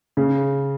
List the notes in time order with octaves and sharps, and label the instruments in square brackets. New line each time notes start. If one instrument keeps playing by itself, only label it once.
[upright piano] C#3